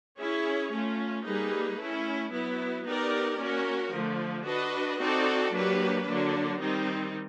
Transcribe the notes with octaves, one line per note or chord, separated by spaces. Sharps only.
C#4 E4 G#4 C#5
A3 C#4 F4
G3 A#3 D#4 G#4 B4
A3 C#4 E4
F#3 B3 E4
B3 D#4 G4 A#4 D5
A#3 C#4 F#4 A#4
D3 F3 A3
D4 F#4 B4 D#5
C4 D#4 F#4 A4 D5
F#3 A#3 D4 G4 B4
D3 F#3 A#3 D4
D#3 G3 C4 D#4